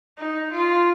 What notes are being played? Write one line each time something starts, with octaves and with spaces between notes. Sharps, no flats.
D#4
F4